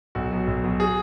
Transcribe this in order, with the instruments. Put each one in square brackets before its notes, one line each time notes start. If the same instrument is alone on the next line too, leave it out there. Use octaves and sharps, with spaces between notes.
[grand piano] B1 F#4
B2 F#3
B1
B2 F#3
G#4